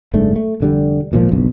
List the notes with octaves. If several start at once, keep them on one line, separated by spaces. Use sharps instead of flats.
F#1 G#2 A3 D4
A3
F1 D3 G3
G#1 A#2 D#3 F3
F#1 B1 G2